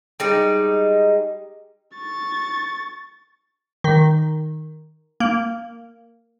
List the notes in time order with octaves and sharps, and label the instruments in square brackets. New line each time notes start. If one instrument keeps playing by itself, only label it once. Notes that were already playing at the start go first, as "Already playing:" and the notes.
[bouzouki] G3 G#3 D#4
[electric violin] C#6 A6
[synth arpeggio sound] D#3
A#3